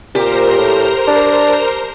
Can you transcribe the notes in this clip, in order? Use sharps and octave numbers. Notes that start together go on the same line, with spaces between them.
A#2 G4 A#4 C5 A#5
A2
D4